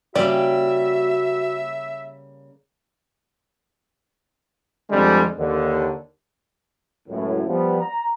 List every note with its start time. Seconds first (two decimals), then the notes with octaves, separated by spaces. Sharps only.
0.15 C#3 G3 A#3 F#4 D5 E5
4.89 F2 D3 G3 G#3
5.38 D#2 D3
7.08 C#2 F#2 A2
7.47 F3 G3 B3
7.80 A#5